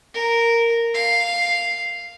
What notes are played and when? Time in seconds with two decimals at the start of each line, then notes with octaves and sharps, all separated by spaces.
0.14 A#4
0.95 F5